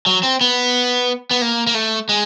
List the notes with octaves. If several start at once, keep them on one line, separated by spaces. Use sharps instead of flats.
F#3
C4
B3
B3
A#3
A#3
A3
G#3